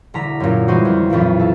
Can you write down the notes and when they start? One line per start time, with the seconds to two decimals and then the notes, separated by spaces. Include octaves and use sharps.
0.14 E1 D3 A#5 B6
0.40 F#2 A#2
0.68 E3 G3 G#3 D#4 F#4 C5
0.85 F2
1.10 B1 F2 A#2 E3
1.39 A4